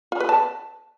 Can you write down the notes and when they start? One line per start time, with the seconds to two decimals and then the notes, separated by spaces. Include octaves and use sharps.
0.12 F4
0.20 B4
0.29 A5